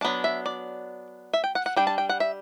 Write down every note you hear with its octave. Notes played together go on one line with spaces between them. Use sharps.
F#3 B3 D4 A5
E5
D5
E5
G5
F#5
F#5
G3 D4 G5
A5
G5
F#5
E5